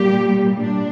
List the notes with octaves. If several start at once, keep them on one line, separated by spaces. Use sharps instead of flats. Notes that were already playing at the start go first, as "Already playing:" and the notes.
Already playing: A#2 G3 G4
D4